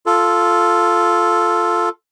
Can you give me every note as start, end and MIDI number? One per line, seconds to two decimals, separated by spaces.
0.06 1.89 65
0.06 1.89 69